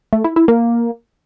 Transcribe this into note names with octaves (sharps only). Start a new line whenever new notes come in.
A3
E4
E4
A#3